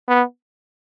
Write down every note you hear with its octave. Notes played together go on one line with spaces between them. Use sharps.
B3